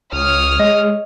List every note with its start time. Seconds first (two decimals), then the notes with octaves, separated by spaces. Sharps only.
0.13 C#2 C#5 D#6 F6
0.59 G#3 D#5